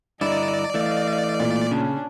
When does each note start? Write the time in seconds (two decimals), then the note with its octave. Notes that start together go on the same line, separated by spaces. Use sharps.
0.21 G2 D3 E4 D5 D#5 A#5
0.74 E3 A3 D#5 F5
1.40 A#2
1.71 C#3 C#4 D4